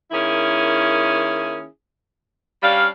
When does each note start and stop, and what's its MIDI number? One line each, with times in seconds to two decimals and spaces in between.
0.12 1.65 51
0.12 1.65 58
0.12 1.65 61
0.12 1.65 64
0.12 1.65 68
2.63 2.87 55
2.63 2.87 61
2.63 2.87 62
2.63 2.87 77